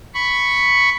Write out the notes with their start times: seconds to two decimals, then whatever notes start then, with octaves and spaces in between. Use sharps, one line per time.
0.14 B5 C#6